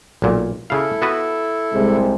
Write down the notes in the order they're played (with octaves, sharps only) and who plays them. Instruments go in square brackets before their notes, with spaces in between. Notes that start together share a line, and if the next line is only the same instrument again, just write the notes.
[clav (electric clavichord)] B1 A#2
[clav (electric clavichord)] C#3 F5 [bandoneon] E4 A4
[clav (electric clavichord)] B3 F#4 B4
[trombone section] C2 C3 G#3